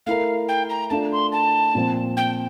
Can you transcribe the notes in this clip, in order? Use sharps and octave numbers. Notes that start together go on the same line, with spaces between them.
A3 E4 A#4 F5
G5
A#5
A3 D4 F4 A5
C6
A5
A#2 F3 C4
G5